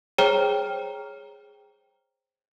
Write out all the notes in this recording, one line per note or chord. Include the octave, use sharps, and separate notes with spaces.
G#4 C5 C#5 G5 A#5 F6